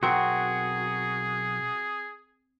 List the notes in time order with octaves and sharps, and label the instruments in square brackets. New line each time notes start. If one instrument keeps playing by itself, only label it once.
[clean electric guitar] B1 A#4 [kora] C4 [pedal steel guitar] F#4 [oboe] G#4